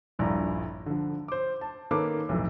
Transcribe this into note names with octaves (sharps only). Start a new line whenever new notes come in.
D#1 A#1 G2 E4 A#5
D3 F3
C5 D6
A5
D#3 A#3 C#4 A4 B4 D6
B1 F2 A2 E3